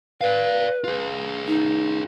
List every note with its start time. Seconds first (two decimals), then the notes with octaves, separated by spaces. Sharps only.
0.21 B4 D5 F5
0.84 F4 G#4
1.47 D#4